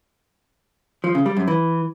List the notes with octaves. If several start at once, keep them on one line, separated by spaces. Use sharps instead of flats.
F3
C#3
G3
F#2
E3